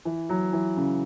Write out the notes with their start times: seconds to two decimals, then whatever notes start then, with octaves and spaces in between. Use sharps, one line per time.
0.05 E3
0.29 F#3
0.53 E3
0.77 C#3